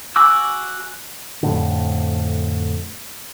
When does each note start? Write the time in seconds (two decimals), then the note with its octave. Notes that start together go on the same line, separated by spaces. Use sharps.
0.16 F#4 G#5 D6 E6
1.43 F2 A2 D3